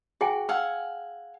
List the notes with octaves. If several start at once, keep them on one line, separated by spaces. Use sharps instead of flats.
F#4 G#4 G5 G#5
F5 F#5 G#5 E6